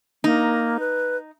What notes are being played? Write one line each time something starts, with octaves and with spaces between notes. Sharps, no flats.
A#3 D#4
B4